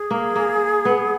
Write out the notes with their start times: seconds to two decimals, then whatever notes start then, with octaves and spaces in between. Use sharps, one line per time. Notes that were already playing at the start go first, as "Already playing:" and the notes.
Already playing: G#4
0.11 A#3
0.36 A#3
0.85 B3